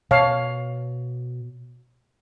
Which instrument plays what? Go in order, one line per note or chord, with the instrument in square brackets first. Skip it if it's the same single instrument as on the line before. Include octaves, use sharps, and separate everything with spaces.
[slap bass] B2 [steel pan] C#5 F5 A5